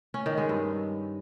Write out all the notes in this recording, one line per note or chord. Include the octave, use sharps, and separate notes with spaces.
C#4
D#3
G#3
G2